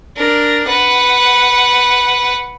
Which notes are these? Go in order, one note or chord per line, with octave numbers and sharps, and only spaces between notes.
D4 A#4
B4 F#5